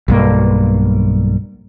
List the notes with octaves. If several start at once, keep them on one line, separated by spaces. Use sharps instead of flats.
B1 G2 A#3